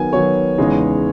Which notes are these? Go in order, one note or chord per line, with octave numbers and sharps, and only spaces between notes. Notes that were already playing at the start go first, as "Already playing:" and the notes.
Already playing: D#3 F#3 B3 G#5
D#3 F#3 B3 C#5
E2 C#3 G#3 B3 D#4